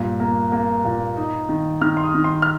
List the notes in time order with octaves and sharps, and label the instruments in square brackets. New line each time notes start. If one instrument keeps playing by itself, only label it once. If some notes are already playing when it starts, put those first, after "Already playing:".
Already playing: [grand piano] G2 A#2
A#3
A#3
A#2
D#4
D#3
D#3 F6
C6
D#6
D#3
C6
F6